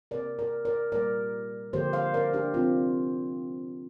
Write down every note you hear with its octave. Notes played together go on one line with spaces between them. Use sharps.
C3 A#3 A#4 D5
A#4 D5
A#4 D5
A#2 G3 A#3 A#4 D5
D3 F3 A#3 G4 C5
C5 F5
A#4 D5
D4 G4
C3 F3 A#3 C4 F4